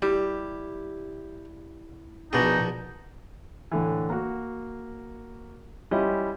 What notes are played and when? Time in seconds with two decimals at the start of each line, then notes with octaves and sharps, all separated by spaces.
0.02 G3 E4 G4
2.33 A#1 B2 B3 D4 D#4 G#4 G5
3.71 A2 D3 E3
4.10 A#3 F#4
5.91 G3 C#4 E4 F4 G4 D#5